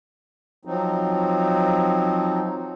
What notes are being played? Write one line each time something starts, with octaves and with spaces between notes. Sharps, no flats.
F3 F#3 C4 D#4